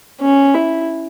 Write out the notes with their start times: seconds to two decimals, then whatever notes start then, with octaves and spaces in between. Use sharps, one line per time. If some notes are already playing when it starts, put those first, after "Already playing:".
0.21 C#4
0.54 E4